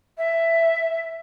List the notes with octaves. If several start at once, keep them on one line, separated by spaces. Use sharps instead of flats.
E5